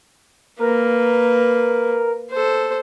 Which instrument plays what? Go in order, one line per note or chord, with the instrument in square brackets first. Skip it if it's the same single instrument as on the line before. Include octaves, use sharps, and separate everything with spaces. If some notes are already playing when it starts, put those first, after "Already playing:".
[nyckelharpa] A#3 B4 [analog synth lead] A#4
[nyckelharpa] A4 C5